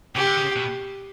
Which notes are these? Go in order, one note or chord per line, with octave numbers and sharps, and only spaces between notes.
C#3 G4
D3
C#3
B2